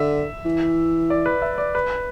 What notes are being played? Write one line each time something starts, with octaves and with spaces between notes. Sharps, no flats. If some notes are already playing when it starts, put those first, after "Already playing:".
Already playing: D3 E5
E3
D5
B4
E5
D5
B4